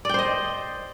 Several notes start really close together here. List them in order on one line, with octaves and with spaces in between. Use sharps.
D5 G5 C5 D#5